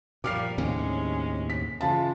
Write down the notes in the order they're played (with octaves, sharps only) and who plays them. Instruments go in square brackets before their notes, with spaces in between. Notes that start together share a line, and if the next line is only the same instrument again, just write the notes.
[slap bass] A#2 [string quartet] F3 G3 A#3 [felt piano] D6 F6 C7
[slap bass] D#2 A2 C3 [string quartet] G#3 C#4
[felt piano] B6
[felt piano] C#3 F4 A5 [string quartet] E3 G#3